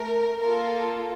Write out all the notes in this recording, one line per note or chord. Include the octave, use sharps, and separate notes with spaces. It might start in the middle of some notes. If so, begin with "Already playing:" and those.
Already playing: A3 A#4
A#3 F4 A4 A#4